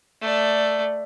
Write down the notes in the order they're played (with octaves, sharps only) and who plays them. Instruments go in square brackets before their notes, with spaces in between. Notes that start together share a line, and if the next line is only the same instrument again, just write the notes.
[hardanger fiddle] A3 D5